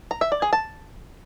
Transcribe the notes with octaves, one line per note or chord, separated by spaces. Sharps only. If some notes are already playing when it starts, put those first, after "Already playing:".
A#5
E5
D5
G#4
A5